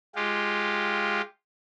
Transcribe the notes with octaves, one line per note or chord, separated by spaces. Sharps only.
G#3 F4 G4